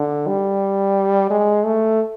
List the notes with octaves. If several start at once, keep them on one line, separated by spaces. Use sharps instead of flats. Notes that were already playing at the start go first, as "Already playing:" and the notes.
Already playing: D3
G3
G#3
A3